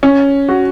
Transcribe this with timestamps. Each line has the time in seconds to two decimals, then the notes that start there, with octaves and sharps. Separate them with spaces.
0.03 C#4
0.49 F#4